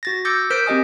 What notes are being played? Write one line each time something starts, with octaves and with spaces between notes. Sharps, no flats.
F#4 A6 A#6
D6 E6 G6 A6 A#6 C#7
A#4 C5 F6 G6 B6 D7
C4 G4 D#5 G#5 D#6